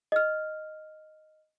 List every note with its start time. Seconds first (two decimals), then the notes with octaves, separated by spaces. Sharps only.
0.12 D#5 F6